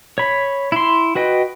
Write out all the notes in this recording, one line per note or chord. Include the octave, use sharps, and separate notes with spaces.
C#5 B5
E4 C6
F#4 B4 D#5 G5